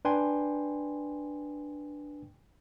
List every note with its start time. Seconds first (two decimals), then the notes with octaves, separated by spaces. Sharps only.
0.05 D4 B4 G5 G#5 C6